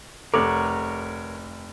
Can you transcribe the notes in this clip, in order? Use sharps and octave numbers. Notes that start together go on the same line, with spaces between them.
F1 A4 A#4 C#5 F#5 D6